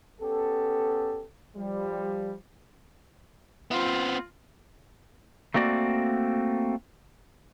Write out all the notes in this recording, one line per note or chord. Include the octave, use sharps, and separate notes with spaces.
B3 C#4 G4 A4
F3 G3
B3 C4 F4
A3 A#3 C4 F#4 D5